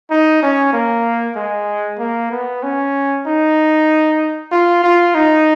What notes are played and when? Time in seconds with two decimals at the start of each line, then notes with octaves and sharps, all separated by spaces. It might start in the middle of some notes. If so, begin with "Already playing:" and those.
0.11 D#4
0.43 C#4
0.73 A#3
1.36 G#3
1.99 A#3
2.31 B3
2.63 C#4
3.26 D#4
4.52 F4
4.84 F4
5.15 D#4